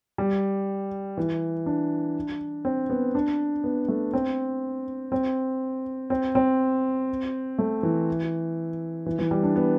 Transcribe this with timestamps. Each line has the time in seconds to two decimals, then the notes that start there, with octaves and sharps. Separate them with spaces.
0.18 G3
1.17 E3
1.66 D4
2.65 C4
2.90 B3
3.15 D4
3.64 B3
3.88 A3
4.13 C4
5.12 C4
6.10 C4
6.35 C4
7.59 A3
7.83 E3
9.06 E3
9.19 E3
9.31 G3
9.43 D4
9.56 B3